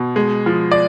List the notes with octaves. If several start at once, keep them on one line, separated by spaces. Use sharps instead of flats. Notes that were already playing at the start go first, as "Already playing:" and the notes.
Already playing: B2
G#3
F3
D5